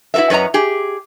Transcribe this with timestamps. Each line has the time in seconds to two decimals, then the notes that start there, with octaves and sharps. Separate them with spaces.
0.14 E4 F#4 A#4 B4 E5
0.30 F#2 B4 C#5 D#5 A#5
0.54 G4 G#4